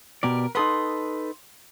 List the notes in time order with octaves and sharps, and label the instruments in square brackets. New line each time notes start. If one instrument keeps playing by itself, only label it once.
[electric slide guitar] B2 G4 D5 [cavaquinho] A#4
[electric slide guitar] D#4 A4 B4 [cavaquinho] F#5 C6 D#6